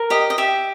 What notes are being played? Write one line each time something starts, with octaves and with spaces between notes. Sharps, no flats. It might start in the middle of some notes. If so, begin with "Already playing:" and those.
Already playing: A#4
G4 D#5
D#5
G4 E5